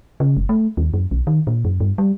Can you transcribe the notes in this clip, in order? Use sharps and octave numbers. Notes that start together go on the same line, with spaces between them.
C#3
F#1
A3
D#2
F#2
B1
D#3
A#2
F#2
G2
G3